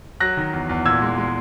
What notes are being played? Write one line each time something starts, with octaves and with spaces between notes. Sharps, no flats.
F#3 F#6 A#6
D#3
E2
E2
A#2 E6 G#6
G#3
G#3